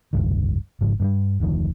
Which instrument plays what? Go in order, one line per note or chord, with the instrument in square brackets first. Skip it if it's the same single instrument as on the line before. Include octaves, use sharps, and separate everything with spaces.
[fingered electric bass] F1 C#2 G2 D#3
G#1 G#2 C#3 F3
G2 F3 G3
F1 D2 D#3 F3